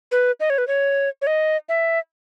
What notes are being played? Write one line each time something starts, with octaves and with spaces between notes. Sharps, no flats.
B4
D#5
C#5
B4
C#5
C#5
D#5
E5